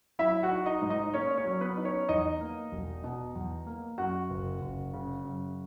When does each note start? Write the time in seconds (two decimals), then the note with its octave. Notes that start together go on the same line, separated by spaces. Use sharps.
0.19 F#3 E4 E5
0.43 F#4 F#5
0.51 D#4
0.66 D#4 D#5
0.82 G#2
0.90 D#4 D#5
1.14 A#3 C#4 C#5
1.37 C#4 C#5
1.45 F#3
1.61 B3 B4
1.77 D#4
1.85 C#4 C#5
2.08 E2 D#4 D#5
2.41 A#3
2.72 E1
3.04 B2
3.35 E2
3.67 A#3
3.98 F#2 F#4 F#5
4.30 F#1
4.61 F#1
4.93 C#3
5.25 F#2